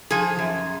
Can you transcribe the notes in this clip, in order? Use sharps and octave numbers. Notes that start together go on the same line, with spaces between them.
F3 G#4
F#2